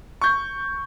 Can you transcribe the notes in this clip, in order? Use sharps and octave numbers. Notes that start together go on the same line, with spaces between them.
C#6 G6